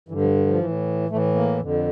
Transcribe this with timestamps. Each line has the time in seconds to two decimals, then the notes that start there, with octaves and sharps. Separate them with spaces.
0.08 G2 D3 E3
0.21 F3
0.47 F3
0.58 A2 E3
1.09 A2 E3 A3
1.35 A#3
1.60 F2 D3